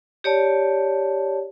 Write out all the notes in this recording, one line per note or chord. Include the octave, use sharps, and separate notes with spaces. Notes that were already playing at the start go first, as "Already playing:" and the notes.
G4 C#5 D5 A5